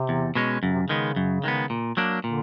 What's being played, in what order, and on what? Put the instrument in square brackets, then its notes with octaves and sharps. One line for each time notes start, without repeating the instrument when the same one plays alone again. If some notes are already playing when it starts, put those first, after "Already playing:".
Already playing: [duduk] C3
[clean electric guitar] E2
B2 G#3 C#4
[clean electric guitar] F#2 [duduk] C#3
[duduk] C3
C#3
[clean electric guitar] D#3 G#3 B3
F#2
D#3 G#3 B3
A#2
F#3 A#3 D4
[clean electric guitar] A#2 [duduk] D3